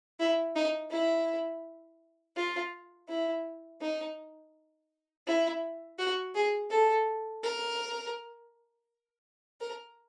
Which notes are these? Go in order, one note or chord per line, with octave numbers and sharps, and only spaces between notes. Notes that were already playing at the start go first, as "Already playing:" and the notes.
E4
D#4
E4
F4
E4
D#4
E4
F#4
G#4
A4
A#4
A#4